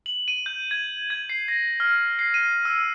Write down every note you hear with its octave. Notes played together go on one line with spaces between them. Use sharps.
F#7
D#7
G6
G#6
G#6
C7
A#6
F6
C7
D#7
E6